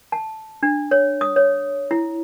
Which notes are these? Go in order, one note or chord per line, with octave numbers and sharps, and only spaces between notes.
A5
D4
C#5
D#6
C#5
E4